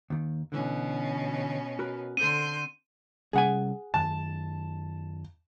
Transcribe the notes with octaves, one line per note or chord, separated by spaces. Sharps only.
D#2 D#3
B2 D3 E3 C#4
F#4 A#4 B4
D3 C4 A4 C6 G6 D#7
C3 G3 C#4 G#4 F#5 G#5
F#2 D#3 A5